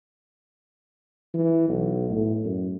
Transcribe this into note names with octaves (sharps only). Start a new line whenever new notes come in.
E3
B1
A2
F#2